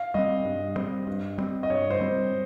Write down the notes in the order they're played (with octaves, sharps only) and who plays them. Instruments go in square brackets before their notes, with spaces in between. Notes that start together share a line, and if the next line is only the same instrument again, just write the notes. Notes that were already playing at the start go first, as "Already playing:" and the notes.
Already playing: [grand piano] F5
[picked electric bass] G3 C4 [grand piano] D#5
[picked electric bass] G2
G3 C4
G2
G3 C4
[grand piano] D#5
[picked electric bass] G2 [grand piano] C#5
[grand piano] C5
[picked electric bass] G3 C4